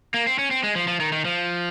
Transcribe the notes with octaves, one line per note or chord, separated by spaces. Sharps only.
A#3
C4
C#4
C4
G#3
F3
F3
D#3
D#3
F3